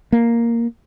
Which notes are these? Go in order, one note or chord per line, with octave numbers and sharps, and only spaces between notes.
A#3